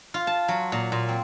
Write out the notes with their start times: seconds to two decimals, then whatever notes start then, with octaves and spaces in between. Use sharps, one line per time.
0.14 F4
0.27 A5
0.48 F#3
0.72 A#2
0.92 A#2
1.08 C4